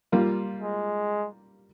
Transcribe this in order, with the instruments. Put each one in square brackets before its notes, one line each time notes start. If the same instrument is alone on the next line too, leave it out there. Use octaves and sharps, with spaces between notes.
[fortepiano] G3 A#3 F4
[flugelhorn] G#3